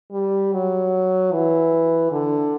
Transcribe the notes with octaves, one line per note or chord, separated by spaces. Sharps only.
G3
F#3
E3
D3